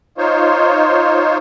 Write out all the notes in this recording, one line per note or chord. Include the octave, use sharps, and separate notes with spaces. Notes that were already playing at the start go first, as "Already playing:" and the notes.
D#4 F4 C5 C#5